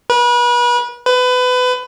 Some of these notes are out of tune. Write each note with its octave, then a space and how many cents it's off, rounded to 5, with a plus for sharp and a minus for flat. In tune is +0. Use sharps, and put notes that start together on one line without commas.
B4 -35
B4 +25